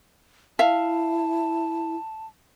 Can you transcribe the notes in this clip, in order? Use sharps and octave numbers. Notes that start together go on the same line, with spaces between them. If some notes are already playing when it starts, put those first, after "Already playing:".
E4 E5 F5 A5